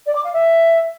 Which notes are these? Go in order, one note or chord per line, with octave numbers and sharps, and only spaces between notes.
D5
D6
F5
E5